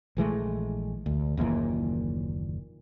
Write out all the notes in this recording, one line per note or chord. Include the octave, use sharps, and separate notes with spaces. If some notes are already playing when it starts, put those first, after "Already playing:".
A#1 E3 G#3 A3
D2
F#1 D#2 A#2 E3